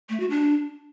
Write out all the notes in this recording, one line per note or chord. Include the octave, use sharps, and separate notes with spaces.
A3
F#4
D4